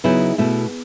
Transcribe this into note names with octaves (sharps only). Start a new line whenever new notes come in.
C#3 F#3 B3 D#4 E4 G#4
B2 A3 E4